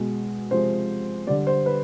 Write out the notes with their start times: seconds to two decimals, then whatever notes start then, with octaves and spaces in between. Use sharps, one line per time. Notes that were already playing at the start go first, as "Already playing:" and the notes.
Already playing: B2 G#3
0.50 C3 F3 G#3 C5
1.27 D3 G3 D5
1.47 C5
1.66 B4